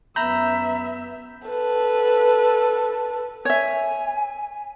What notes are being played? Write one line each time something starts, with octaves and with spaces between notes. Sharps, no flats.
F#2 B3 E5 A#5 B5 G6
A4 B4
C#5 E5 G#5